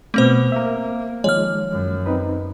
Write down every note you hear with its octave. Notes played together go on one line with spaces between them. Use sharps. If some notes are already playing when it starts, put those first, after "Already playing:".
B2 A3 C4 C5
A#3 A#4 E5
D#3 F3 G#3 C#5 F6
F#2
C4 D#4 B4